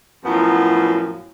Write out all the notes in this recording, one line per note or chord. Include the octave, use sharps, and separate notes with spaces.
F#2 A2 F3 F#3 B3 F4